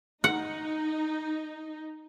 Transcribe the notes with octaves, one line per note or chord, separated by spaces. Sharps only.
D#4 F#5